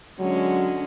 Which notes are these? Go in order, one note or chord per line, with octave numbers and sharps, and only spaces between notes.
D3 F#3 G#3 C#4